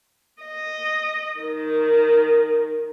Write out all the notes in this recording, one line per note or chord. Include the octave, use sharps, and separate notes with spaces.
D#5
D#3